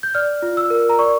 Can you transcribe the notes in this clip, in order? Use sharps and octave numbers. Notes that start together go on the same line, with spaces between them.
G6
D5 F6
F4
E6
A#4
A#5
D5 C#6